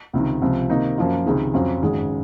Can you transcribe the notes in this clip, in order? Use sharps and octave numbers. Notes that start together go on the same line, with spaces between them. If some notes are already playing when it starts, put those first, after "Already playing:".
C#2 C3 D#3
C#2 C3 F3
C3 D#3 A#3 D#4
F#2 F3 A#3 F4
C#2 C3 D#3 G#3
F2 C3 F#3 C#4 F4
G#1 F#2 C#3 G#3